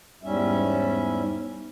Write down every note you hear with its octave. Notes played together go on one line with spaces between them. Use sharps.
E2 G#2 G3 C#4 E5